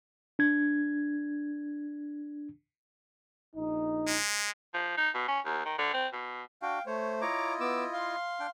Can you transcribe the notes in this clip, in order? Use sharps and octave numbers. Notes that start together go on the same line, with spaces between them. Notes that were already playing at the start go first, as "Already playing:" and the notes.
D4 G#6
A#1 D#4
G#3
F3
D#4
B2
C#4
D#2
D#3
D3
C4
B2
D4 F#4 F5 G5
A3 C5 C#5
E4 F4 C#5 D#5 A#5 D6
B3 D6 E6
F5 C6
D4 G5